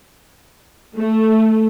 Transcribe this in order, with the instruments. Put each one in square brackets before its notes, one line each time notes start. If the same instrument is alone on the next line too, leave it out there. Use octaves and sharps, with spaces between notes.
[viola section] A3